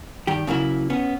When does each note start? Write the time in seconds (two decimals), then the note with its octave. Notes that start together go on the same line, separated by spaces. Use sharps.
0.27 G2 D#3 G4
0.47 C#3 F#3 A#3 E4
0.90 B3 C#4